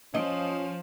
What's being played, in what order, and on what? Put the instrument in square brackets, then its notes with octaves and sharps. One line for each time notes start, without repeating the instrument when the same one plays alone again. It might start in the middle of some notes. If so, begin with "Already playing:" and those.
[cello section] F3 [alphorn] C#4 [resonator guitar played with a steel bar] D#5